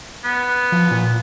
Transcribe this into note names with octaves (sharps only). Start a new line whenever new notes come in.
B3
F3
A#2